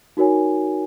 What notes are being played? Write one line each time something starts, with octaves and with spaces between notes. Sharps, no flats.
D#4 F#4 A#4 C#5 G#5